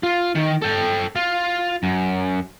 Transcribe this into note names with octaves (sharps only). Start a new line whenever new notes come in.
F4
D#3
A4 G5
F4
F#2